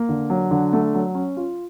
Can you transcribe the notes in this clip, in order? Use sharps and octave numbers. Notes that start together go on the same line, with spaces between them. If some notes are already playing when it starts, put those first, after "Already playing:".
Already playing: A#3
D3
F#3
D3
A3
F#3
C#4
F4